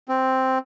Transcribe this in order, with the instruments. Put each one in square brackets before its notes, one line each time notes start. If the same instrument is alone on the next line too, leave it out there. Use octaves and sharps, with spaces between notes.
[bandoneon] C4